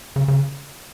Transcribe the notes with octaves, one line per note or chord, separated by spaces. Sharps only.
C#3
C#3